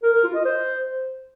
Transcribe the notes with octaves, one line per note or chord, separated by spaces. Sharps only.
A#4
A#4
F4
D#5
C5